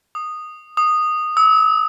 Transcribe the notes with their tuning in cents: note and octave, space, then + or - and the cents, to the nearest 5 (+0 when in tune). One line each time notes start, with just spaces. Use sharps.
D#6 -10
D#6 -10
E6 -40